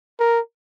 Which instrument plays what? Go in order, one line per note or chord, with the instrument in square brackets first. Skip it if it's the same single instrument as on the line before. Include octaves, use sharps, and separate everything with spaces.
[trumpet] A#4